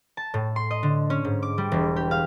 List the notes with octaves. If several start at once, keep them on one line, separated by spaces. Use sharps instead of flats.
A5
A2
C6
D#5
D3
C#4
G#2
D6
G3
E1
G4
F5